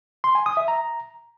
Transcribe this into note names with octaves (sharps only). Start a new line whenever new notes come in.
C6
G#5
D#6
E5
A#5